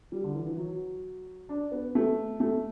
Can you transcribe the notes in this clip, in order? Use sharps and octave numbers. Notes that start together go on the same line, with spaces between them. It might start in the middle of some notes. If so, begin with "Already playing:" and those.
G3
D3
E3
E3
F#3
D4
B3
A3
A3